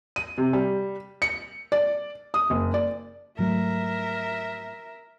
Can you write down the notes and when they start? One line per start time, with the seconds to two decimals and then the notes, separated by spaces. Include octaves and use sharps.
0.16 D#7
0.38 C3
0.53 G3
1.22 C#7
1.72 D5
2.34 D#6
2.50 F#1
2.74 D5
3.38 G#2 F#3 A3 A#4 E5